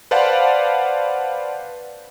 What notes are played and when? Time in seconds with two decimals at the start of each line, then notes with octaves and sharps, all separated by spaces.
0.11 B4 C5 D5 F5 F#5 A5